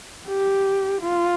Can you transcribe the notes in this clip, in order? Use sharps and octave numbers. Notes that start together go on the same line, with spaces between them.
G4
F4